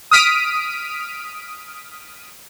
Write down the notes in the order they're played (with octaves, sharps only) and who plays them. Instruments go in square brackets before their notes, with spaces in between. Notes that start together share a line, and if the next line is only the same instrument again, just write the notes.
[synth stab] D#6 F6 B6 D7 D#7